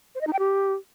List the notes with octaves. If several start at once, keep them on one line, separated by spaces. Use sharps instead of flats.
C5
D#5
D#4
G5
G4